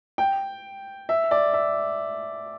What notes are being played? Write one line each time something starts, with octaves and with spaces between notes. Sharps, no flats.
G5
E5
D5
E5